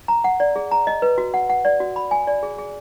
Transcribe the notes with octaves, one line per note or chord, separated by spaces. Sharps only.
A#5
F#5
D5
G#4
A#5
D#5
B4
F#4
F#5
F#5
D5
F#4
B5
G#5
D5
G#4
G#4